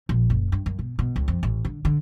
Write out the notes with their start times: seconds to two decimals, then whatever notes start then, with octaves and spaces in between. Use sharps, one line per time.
0.09 A#1
0.30 F#1
0.52 G2
0.66 F#2
0.79 B2
0.99 B2
1.16 C#2
1.28 F2
1.43 A1
1.65 D3
1.85 D3